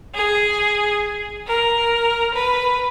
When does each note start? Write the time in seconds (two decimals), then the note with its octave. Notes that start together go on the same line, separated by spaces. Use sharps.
0.15 G#4
1.47 A#4
2.35 B4